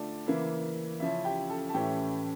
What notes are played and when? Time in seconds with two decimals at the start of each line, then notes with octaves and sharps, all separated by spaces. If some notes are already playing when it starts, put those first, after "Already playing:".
Already playing: D3 A3 D4 F4 D5
0.26 C#3 E3 A#3 E4
1.00 C#3 F3 C#4 E4 E5
1.24 G4 G5
1.49 A4 A5
1.69 A5
1.74 A2 E3 A3 C#4 E4 G4 G5